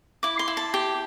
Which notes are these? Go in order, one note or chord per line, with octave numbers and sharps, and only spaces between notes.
E4 D6
C6
E4
A5
G4